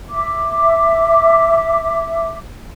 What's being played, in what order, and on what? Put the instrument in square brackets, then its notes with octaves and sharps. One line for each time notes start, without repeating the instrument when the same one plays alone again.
[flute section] E5 D6